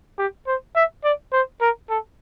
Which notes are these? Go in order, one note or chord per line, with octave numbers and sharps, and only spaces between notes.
G4
C5
E5
D5
C5
A#4
A4